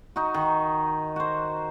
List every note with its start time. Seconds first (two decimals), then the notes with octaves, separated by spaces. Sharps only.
0.16 D#4 F#4
0.34 D#3
1.16 F#4 C5